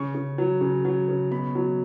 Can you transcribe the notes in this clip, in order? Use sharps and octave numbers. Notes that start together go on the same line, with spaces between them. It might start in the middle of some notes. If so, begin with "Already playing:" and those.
Already playing: C#3 C#6
C#3
F#3
C#3
F#3
C#3
B2 B5
F#3